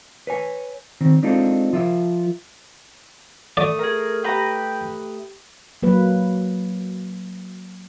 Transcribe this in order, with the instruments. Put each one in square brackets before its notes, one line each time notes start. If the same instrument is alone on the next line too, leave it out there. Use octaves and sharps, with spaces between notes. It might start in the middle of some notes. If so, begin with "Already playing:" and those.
[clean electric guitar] B4 C#5 G#5
D#3 C4
G#3 C4 D4 D#4 F4 A4
F3 F4 A#4 E5
[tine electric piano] A3 D#6 [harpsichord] D5
[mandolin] G#4 A#5 [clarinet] A#4
[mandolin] G4 B4 A#5 [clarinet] G5
[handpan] F#3 A#3 B4